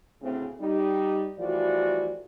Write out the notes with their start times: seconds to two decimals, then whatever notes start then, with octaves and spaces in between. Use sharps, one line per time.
0.22 D2 A2 C#3 C4
0.61 G3 D#4
1.39 E3 F3 G3 A3 F#4 D5